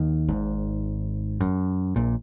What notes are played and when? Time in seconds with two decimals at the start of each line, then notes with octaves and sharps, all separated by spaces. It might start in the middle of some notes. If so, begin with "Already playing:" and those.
Already playing: D#2 D#3
0.28 G#1 G#2
1.41 F#2
1.96 A#1 A#2